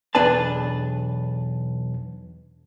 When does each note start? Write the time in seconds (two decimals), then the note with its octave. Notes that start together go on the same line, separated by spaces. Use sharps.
0.15 B1 E2 D4 B4 A5